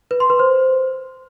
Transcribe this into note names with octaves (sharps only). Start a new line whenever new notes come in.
B4
C6
B4
C5